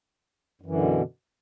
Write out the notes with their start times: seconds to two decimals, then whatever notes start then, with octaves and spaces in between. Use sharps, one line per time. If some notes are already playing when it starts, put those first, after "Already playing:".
0.61 F#2
0.66 E3
0.70 D3
0.75 B2